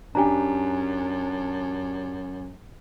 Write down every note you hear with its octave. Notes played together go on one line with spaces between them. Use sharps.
F#2 D4 G4 G#5 A#5